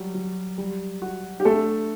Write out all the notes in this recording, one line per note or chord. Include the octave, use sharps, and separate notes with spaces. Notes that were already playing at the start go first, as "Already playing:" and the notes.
Already playing: F#3 G3
F#3
G3
F#4
G4
A3 D4 A4